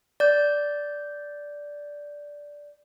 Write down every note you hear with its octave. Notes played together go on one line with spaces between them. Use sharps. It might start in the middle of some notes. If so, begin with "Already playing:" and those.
D5 G6